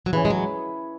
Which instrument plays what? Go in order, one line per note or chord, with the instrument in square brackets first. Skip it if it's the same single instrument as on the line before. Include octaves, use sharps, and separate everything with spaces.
[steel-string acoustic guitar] F#3
[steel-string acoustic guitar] E3 [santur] C#4 E4 G#4 B4
[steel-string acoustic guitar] G#3
F#3